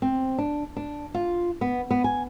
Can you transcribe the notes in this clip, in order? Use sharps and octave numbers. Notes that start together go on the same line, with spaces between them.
C4
D4
D4
F4
B3
B3
G#5